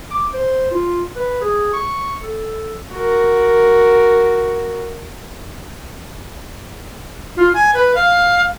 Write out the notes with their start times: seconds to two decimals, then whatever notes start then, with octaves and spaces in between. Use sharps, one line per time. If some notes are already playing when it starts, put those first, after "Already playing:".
0.11 D6
0.34 C5
0.71 F4
1.16 B4
1.41 G#4
1.73 C#6
2.23 A4
2.93 F#4 A#4
7.37 F4
7.54 G#5
7.74 B4
7.95 F5